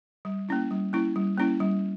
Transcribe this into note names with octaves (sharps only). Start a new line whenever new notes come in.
G3
A#3 C#4 E4
G3
A#3 C#4 E4
G3
A#3 C#4 E4
G3